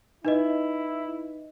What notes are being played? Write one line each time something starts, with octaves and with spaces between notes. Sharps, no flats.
D#4 E4 B4 D#5